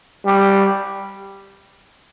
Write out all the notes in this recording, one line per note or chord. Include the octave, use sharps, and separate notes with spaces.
G3